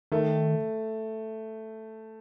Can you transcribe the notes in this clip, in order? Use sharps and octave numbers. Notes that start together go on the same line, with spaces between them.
D#3 A3